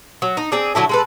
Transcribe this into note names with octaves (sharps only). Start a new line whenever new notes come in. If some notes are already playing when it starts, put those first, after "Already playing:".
F#3
D#4
C4 G#4 D5
D3 F#3 E4 A4
G#3 A4 B4